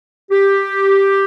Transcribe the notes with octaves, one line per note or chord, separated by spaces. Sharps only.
G4